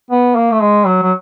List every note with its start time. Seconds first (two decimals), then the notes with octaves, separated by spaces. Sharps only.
0.10 B3
0.36 A#3
0.52 A3
0.62 G#3
0.86 F#3
1.03 F#3